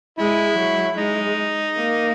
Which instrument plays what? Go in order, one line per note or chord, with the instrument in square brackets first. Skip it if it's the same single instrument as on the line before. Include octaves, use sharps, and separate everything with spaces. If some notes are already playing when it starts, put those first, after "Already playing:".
[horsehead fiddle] G#3 [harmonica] E4
[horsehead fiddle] F#3
[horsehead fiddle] G#3 [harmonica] D#4
[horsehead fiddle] A#3